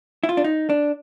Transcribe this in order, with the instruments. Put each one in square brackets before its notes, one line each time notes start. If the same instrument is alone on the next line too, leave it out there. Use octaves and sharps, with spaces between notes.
[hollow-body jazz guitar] E4
F4
D4
D#4
D4